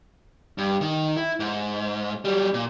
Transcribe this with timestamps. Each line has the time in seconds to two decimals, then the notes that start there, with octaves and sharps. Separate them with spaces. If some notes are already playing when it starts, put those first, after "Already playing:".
0.58 G2
0.81 D#3
1.17 E4
1.40 G#2
2.25 F#3 G3
2.54 A#2